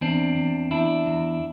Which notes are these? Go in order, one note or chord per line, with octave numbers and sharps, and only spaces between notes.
E2 C4 D4
E2
E2 D4 E4
E2